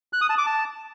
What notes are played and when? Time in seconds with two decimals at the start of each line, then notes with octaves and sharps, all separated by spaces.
0.13 F#6
0.21 D#6
0.30 A5
0.38 D6
0.46 A5